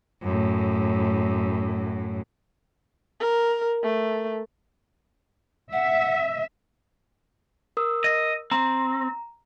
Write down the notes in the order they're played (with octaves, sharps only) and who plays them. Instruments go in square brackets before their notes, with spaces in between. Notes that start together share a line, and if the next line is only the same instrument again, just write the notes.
[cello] F#2 A2
[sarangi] A#4
A3
[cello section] E5 [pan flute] F#5
[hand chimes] A#4 D#6 E6
[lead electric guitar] D#5
[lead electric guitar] C4 [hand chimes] A#5